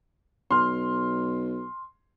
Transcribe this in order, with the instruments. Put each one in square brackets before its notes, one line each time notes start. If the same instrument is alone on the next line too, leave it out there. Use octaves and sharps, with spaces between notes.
[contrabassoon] B1 [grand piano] C6 F6